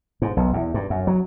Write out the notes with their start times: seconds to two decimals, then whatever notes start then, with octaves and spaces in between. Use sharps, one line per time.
0.22 G#2
0.37 B1
0.53 E2
0.74 G2
0.90 F#2
1.07 F#3